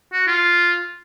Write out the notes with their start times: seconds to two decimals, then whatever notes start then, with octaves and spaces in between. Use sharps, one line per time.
0.13 F#4
0.27 F4